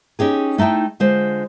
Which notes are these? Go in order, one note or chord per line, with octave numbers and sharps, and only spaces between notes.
C#4 D#4 G4 G#4
A3 D#4 E4 G5 A5
D3 G#3 F4 C5